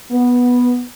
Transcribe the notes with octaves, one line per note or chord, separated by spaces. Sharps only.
B3